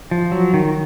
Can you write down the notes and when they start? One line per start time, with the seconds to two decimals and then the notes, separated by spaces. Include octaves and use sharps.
0.11 F3
0.32 F#3
0.54 D#3